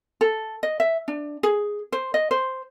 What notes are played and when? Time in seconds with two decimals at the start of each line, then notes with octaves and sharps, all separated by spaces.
0.21 A4
0.63 D#5
0.80 E5
1.08 D4
1.43 G#4
1.92 C5
2.14 D#5
2.31 C5